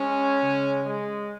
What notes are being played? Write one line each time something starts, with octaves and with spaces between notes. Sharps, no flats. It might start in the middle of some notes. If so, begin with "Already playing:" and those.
Already playing: G#3 C#4
C#3 G#3
G#3